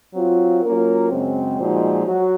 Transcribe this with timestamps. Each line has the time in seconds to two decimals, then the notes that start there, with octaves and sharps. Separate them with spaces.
0.14 F#3 C4 F4
0.62 F#3 A#3 C#4 F4 A#4
1.10 F#2 C#3 G#3 C4
1.59 A#2 F3 G#3 D#4 F#4
2.06 F#3 F#4